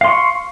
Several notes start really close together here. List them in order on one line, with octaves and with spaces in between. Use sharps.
F5 C6 C#6